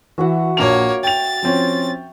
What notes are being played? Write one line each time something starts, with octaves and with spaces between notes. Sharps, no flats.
E3 F#4 E5 F#5
A#1 A#3 C#5 F7
G5 A6 F7
F3 C4 C#4